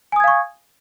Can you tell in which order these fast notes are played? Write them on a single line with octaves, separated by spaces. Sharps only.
G#5 D#6 G#6 F5 C#6